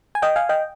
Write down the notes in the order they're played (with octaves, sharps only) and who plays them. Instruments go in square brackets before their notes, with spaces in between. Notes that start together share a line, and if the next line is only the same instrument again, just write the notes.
[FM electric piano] G#5
D#5 G5
F5 G#5
D#5 G5